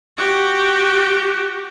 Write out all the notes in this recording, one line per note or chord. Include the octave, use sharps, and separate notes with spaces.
F#4 G4